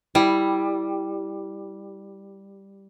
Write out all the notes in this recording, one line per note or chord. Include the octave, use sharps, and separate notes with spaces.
G3 E4